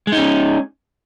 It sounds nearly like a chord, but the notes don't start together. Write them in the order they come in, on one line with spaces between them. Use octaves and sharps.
G#3 D#4 C#4